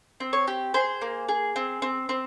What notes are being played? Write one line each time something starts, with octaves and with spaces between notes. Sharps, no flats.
C4
C#5
G4
G#4 C5
A#3
G#4
C4
C4
C4